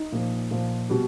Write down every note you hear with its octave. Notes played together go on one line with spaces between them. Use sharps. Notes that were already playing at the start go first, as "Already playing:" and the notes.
Already playing: D#4
A#2 F3
A#2 F3
B2 G3